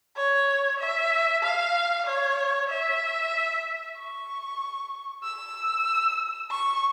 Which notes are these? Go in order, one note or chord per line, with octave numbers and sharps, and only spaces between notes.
C#5
E5
F5
C#5
E5
C#6
E6
C#6